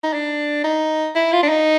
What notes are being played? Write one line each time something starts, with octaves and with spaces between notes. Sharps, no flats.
D#4
D4
D#4
E4
F4
D4
D#4